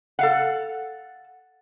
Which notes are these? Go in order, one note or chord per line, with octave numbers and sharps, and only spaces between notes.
A4 F5 F#5